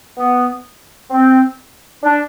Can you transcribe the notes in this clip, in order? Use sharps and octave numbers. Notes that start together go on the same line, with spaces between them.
B3
C4
D4